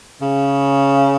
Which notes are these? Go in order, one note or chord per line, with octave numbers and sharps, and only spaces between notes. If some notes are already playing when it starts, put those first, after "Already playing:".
C#3